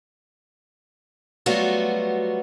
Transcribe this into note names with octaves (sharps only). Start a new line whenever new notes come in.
F#3 G3 A3 B3 F4 F#4